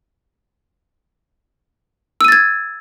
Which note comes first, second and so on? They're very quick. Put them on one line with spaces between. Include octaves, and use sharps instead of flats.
E6 D#7 A6 G#6